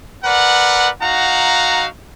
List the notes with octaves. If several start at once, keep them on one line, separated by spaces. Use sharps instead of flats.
A#4 B4 D5 F#5
D#4 F#4 F5 F#5 A#5